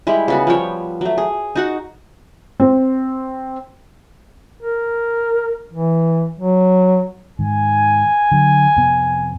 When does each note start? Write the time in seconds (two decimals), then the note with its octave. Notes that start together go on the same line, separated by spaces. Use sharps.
0.07 G3 G#3 E4
0.28 C#3 B3 F#4
0.47 F3 G3 C#5
1.01 F#3 A3
1.18 G#4
1.55 D#4 F#4 F#5
2.60 C4
4.61 A#4
5.73 E3
6.40 F#3
7.39 G#2 D#3 G#5
8.31 D3 F#3
8.76 F2 C3 B3